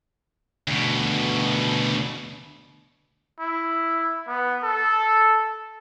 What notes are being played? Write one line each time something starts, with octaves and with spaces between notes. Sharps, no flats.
D2 B2
E4
B3
A4